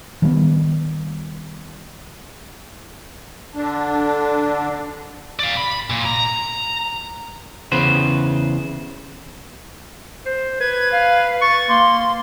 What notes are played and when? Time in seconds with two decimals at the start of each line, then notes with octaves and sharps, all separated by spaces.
0.22 D#3 G3 A#3 B3
3.55 D3 D4
5.39 D5 F5
5.57 B5
5.90 A#2
6.06 A#5
7.72 E2 C#3 B4 C5
10.26 C5
10.60 B4 G#6
10.92 F5
11.42 C#6 A6
11.69 A#3 C6